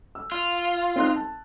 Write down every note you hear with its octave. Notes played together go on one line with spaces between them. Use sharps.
E6
F4
C4 D#4 F#6
A5